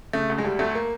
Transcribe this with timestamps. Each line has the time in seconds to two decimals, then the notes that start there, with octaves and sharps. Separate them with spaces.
0.13 C#3 A3
0.30 D2
0.38 G#3
0.44 D2 G3
0.59 D2 A3
0.75 A#3